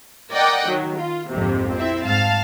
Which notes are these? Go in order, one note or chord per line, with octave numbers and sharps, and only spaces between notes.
A#4 D5 D#5 F#5 G5
D#3 F#3
F4
A#1 F2 G#2 C3
C4 E4 E5
G#2 F5 A5